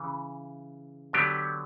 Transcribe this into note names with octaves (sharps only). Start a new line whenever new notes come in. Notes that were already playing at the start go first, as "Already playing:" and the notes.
Already playing: C#3 E3
D3 F#3 B3 D4 G4